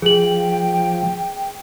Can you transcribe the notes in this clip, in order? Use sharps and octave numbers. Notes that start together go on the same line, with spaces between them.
F3 G#4 G5 F#7